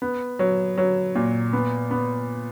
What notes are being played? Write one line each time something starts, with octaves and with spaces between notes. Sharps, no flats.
B3
F#3
F#3
A#2
B3
B3